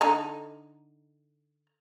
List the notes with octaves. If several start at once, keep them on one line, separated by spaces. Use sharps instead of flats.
D3 D#4 A#5